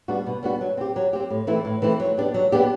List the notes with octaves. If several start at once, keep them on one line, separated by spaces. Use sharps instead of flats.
G3 B3 D4 F#4
B2
G3 B3 D4 F#4
F#3
C4 G4
F#3
C4 G4
A2
E3 A3 C4 E4
A2
E3 A3 C4 E4
F#3
B3 D4 G4
F#3
B3 D4 G4